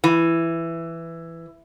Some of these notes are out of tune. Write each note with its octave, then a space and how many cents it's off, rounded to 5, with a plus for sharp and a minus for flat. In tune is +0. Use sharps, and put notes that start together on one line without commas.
E3 +10